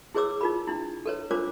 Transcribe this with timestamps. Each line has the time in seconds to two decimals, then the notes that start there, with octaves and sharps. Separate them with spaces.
0.15 E4 G#4 B4 C#5 D6 E6
0.41 D#4 F4 A#4 B5
0.67 D4 E4
1.06 A4 B4 C#5
1.31 D4 F4 A#4 C5 C#5 D6